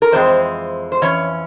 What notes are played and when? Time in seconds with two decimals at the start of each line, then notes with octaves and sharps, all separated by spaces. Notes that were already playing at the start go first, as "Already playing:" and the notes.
0.02 A#4
0.12 F2 E3 G#3 C4 C5
0.92 C5
1.02 F2 E3 C#4 C#5